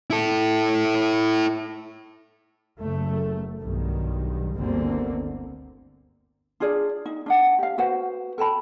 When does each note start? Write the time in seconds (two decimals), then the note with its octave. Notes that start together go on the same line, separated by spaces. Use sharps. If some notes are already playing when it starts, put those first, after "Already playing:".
0.10 E4 A4
2.82 F#1 A3
3.60 B1 G2 D#3
4.55 G1 D2 D3 A#3 C4
6.60 D4 F4 G#4 D5
7.06 D#4
7.26 D4 D#5 F#5
7.59 G4 F5
7.78 F#4 B4 C5 F#5
8.38 A4 G5 A5 B5